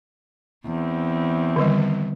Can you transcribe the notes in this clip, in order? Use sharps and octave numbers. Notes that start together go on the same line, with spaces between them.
E2 C4
D3 D#3 G3